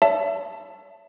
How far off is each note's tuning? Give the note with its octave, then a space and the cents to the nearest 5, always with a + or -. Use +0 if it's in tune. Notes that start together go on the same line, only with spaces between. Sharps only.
C#5 +45 E5 +20 A5 +0